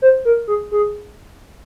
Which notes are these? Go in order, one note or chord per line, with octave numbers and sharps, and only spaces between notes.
C5
A#4
G#4
G#4